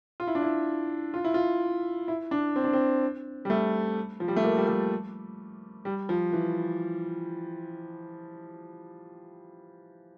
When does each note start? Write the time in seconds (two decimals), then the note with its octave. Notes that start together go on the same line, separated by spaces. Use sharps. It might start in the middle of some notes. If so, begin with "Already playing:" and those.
0.20 F4
0.27 E4
0.35 D4
0.43 E4
1.14 F4
1.24 E4
1.34 F4
2.08 E4
2.31 D4
2.56 C4
2.64 D4
2.73 C4
3.45 G3
3.50 A3
4.20 F3
4.28 G3
4.36 A3
4.44 A#3
4.57 G3
4.68 A3
5.85 G3
6.09 F3
6.33 E3